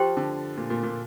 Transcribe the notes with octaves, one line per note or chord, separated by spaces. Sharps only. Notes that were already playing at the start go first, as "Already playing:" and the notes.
Already playing: F3 G4 C5 G5 C6
D3
A#2
A#2
A#2